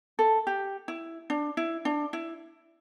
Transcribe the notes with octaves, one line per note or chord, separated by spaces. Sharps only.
A4
G4
E4
D4
E4
D4
E4